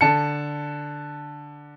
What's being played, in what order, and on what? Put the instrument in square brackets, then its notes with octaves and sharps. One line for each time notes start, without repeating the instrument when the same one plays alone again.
[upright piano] D3 A5 C#7